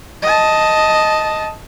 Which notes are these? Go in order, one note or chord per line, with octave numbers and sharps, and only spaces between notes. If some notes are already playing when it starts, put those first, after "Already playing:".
D#5 A5